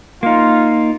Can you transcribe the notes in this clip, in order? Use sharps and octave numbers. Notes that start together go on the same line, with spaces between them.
A#3 D#4 F4